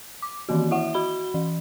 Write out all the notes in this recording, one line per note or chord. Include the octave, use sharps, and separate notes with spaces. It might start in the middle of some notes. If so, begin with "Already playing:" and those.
D6
D#3 E3 A#3 F#4
E4 E5 F#5
F#4 B5 G7
E3